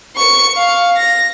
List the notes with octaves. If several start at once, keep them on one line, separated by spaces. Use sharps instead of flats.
C#6 C#7
F5
A#6